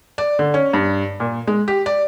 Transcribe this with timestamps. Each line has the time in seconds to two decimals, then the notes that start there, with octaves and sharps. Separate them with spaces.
0.18 D5
0.39 D3
0.54 C#4
0.73 G2
1.20 A#2
1.47 G#3
1.68 G4
1.86 D5